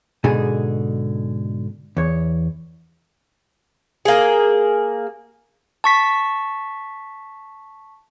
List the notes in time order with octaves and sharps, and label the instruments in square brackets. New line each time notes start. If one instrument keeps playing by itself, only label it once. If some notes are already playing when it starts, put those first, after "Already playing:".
[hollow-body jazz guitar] G#2 B2 D3 D#4 G#4
E2 C#5
[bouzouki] A#3 G#4
[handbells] A5 C#6 B6